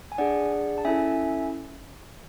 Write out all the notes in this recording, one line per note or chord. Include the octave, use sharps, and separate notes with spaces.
G#5
D4 G#4 D5 F#5
A5
C#4 E4 A4 E5 G#5